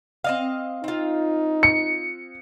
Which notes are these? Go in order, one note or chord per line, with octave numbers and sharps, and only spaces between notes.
C4 D#5 F5
C4 D#4 F4
C#7